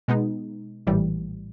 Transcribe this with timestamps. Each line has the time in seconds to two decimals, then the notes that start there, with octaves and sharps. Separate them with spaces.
0.08 B2 G#3 B3 D#4
0.87 A#1 A2 E3 G3